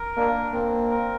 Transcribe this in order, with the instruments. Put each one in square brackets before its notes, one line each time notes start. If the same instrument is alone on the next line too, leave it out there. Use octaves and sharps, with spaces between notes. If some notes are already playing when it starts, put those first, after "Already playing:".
Already playing: [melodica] A#4
[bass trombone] A#3 [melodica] D4
[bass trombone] A#3 [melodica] C4
[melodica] A#4